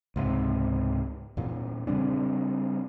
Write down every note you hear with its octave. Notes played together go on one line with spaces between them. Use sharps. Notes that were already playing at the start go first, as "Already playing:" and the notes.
C#2 G#2 C3
E2 A#2
C#3 G3 C4 D4